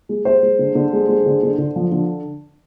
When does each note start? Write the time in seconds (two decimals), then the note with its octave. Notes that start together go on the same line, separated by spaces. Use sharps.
0.09 G#3
0.25 G#3 C5
0.43 G#3
0.59 D3
0.75 D3
0.93 G#3
1.09 G#3
1.26 D3
1.43 D3
1.58 D3
1.76 F3
1.92 D3